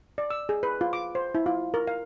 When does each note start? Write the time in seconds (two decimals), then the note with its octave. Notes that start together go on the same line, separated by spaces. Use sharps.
0.18 D5
0.30 E6
0.49 G#4
0.63 B4
0.81 F4
0.93 D6
1.15 C5
1.35 E4
1.46 F4
1.74 A#4
1.88 F5